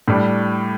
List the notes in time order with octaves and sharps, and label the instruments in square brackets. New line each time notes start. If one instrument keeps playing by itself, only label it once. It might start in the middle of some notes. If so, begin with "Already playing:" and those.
[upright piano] A2 G3 D4